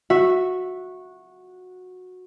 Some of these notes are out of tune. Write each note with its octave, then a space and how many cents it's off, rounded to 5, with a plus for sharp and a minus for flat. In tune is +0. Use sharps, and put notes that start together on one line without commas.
F#4 -15 E5 +0